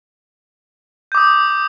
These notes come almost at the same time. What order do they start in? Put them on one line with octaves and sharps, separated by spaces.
G6 D6 D#6